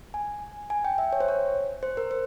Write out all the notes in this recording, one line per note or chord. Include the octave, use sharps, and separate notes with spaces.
G#5
G#5
G5
E5
C#5
C5
C#5
C5
A#4
C5